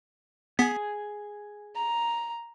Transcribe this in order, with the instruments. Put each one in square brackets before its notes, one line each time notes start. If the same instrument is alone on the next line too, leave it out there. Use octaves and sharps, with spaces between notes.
[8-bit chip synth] B3 B6 [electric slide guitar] G#4 G#5
[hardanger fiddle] A#5